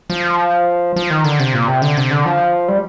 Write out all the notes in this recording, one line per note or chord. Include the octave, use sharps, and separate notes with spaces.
F3
F3
D#3
D3
C3
A#2
C3
D3
C3
D3
F3
G3